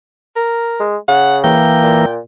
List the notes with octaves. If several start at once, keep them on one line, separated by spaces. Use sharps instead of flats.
A#4
G#3
C#3 F#5
E3 A#3 G5
A#2